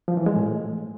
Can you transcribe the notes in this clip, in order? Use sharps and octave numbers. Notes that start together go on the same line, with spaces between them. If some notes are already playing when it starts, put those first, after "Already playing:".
F3
E3
G#3
A2